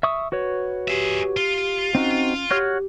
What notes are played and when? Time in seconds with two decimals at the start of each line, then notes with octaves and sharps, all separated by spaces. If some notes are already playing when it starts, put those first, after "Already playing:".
0.03 E5 C#6 D#6
0.32 F#4 B4 C#5
0.88 G4 G#4 E5
1.37 F4
1.95 C4 C#4 D#4 F#4
2.51 F#4 G4 C#5 F6